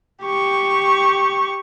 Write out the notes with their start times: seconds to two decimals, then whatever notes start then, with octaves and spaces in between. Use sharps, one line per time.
0.24 G4 C#6